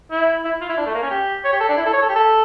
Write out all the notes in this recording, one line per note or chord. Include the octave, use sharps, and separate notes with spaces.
E4
E4
F4
E4
D4
A3
A#3
C#4
G4
C#5
G4
A4
D4
E4
A4
C#5
A4
G4
A4